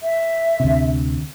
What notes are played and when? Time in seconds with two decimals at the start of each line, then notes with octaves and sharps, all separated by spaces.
0.03 E5
0.60 D2 C3